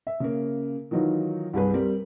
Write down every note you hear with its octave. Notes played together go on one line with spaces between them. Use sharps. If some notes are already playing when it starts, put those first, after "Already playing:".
E5
C#3 A#3
D#3 E3 F#3 D#4 F4
C2 G2 G#4 B4
G3 C4 A#4